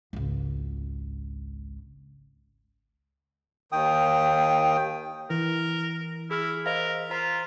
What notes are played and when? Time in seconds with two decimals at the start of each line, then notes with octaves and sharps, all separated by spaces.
0.13 G#1 C#2
3.72 D#2 D#3 G5 D#6
5.30 E3 A#4
6.31 E4 G#4 F6
6.66 A#4 C5 D#5 F5
7.11 F4 C5 A#5 B6